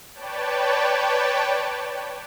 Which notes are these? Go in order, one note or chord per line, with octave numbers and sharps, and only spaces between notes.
B4 C#5 D5 G5 A5